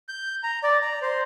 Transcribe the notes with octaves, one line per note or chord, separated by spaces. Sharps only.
G6
A#5
D5
A#5
C5